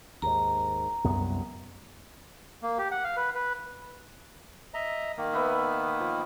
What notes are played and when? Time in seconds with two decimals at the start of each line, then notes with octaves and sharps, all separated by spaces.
0.22 D#2 G#2 A#5
1.04 C2 F#2 B3
2.63 A#3
2.78 G4
2.91 F#5
3.04 F5
3.17 B4
3.35 B4
4.74 D#5 E5 A#5
5.18 D#3 A#3
5.33 B3 B4 E5
6.00 F3